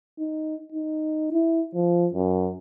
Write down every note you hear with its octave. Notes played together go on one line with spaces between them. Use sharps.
D#4
D#4
E4
F3
F#2